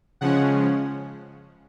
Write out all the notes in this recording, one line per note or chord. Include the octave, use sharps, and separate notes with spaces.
C#3 F3 G#3 C#4 F#5